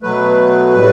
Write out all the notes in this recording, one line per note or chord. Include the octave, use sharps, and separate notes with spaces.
B2 F#3 A3 B4
A2 G3